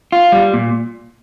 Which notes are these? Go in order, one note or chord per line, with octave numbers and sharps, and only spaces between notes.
F4
G3
A#2